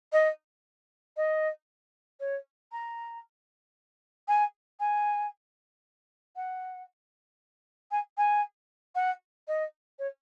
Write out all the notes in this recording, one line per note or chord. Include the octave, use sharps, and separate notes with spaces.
D#5
D#5
C#5
A#5
G#5
G#5
F#5
G#5
G#5
F#5
D#5
C#5